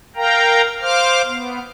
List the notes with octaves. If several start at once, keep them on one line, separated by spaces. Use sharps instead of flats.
A#4 F5 G5 A#5
C5 F5 D6 F6
B3